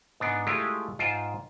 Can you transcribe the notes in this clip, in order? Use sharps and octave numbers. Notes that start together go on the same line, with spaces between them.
G#2 B3 D4
G#3 A3 E4 F4 G4
G#2 F4 C5 G5